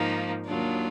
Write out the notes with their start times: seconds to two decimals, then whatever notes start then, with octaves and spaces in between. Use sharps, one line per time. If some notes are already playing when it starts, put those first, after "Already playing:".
Already playing: G#2 F3 A#3 D#4
0.46 D#2 D#3 F#3 D4 F4